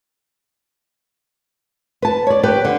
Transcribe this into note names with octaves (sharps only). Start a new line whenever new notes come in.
B4 A5
C#5 D5
G4 B4
D3